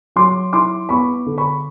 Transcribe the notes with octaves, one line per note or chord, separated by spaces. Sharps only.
F#3 C6 D6
E4 C6 D6
B3 B5 C#6
D3
B5 C#6